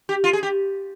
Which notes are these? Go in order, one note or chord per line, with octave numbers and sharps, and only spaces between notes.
G4
F4
G#4
G4